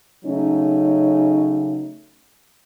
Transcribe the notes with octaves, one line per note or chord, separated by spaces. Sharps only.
C#3 F#3 A3 C#4 D#4